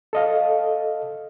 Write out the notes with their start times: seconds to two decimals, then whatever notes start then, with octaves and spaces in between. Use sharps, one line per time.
0.13 A4 D#5 F5